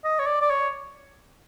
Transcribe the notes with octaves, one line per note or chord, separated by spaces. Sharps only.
D#5
C#5
D5
D5
C#5